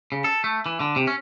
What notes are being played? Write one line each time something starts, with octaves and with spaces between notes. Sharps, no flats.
C#3
A4
A3
E3
D3
C3
C#4